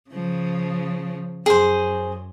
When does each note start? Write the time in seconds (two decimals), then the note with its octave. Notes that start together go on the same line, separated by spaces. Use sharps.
0.10 C#3 F3
1.46 F#2 G#4 C5